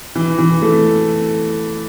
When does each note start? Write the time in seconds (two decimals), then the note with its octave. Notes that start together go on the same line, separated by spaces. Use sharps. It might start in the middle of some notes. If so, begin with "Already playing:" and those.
0.16 E3
0.38 E3
0.62 A3